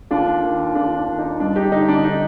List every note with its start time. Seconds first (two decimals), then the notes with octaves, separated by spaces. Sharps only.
0.11 D#2 D4 F4
0.43 D#3
0.75 D#2 D4 F4
0.97 D4
1.08 D#3
1.19 D#4
1.40 G2 D4
1.56 D#4 G4
1.72 D3 D#4
1.88 D4
2.04 D#4